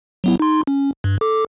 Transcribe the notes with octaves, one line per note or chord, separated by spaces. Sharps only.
F#3 B3 E4
D#4 C6
C#4
G2
A4 D6